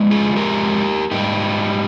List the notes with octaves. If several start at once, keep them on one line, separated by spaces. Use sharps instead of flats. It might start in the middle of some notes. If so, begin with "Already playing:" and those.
Already playing: F2 G#3
F4 G#4
G4 A#4
G#2 G3 D#4 G4